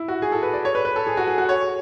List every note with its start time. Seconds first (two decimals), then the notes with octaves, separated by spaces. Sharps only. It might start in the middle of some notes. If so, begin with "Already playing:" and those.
Already playing: E4
0.08 F#4
0.22 G#4
0.32 A4
0.43 B4
0.53 D5
0.65 C#5
0.75 B4
0.85 B4
0.96 A4
1.07 G#4
1.17 F#4
1.27 G#4
1.38 F#4
1.49 C#5